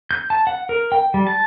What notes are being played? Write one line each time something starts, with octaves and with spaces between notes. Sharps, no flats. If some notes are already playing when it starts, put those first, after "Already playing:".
G6
A5
F#5
A#4
G5
G3
A5